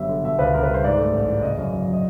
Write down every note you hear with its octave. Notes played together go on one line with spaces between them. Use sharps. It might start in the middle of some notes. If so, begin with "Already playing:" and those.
Already playing: G1 F#2 F#3 G3 E5
D3
B2 E5
C#2 B4
C#2 A#4
B4
G3 C5
G#2 D5
A3
A1
E3
C#3 D#5
F#2
F#2
F#3
D#5